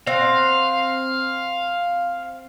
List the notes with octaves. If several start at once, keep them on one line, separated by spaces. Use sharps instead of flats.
C4 F5 F#5